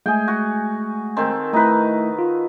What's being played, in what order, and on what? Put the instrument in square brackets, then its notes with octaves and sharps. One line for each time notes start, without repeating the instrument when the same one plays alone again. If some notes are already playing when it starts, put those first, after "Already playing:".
[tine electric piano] G#3 A3 [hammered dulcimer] G#4 G5
[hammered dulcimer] F#4
D#3 C4 A4
[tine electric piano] A3 E4 [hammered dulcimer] D#4 B4
[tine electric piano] F4